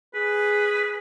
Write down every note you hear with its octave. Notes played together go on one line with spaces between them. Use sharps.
G#4 B4